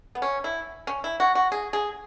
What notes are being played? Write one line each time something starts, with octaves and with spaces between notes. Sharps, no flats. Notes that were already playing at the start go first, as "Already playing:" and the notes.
B3
C#4
E4
C#4
E4
F#4
F#4
G#4
G#4